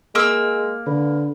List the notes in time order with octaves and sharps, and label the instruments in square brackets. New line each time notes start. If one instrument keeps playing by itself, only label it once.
[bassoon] G#3 [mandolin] A#3 E6
[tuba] D3 [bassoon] B4